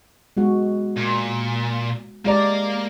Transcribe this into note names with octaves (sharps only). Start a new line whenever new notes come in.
G#3 B3 F#4
A#2
G#3 A#3 G4 D5 A#5